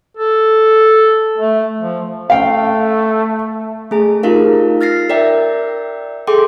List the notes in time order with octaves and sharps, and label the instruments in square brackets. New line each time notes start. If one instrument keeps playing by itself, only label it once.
[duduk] A4
A3
F3
[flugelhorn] A3 [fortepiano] F5 G5
[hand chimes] A3 G#4 A5
D#4 F4 G4 A#4 F5
F6 A6 A#6 C7
A#4 D5 E5 G5
G#4 A4 G5 C6 D6